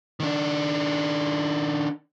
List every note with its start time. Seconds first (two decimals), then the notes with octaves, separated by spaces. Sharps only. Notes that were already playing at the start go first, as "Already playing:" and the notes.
0.20 D#3 D4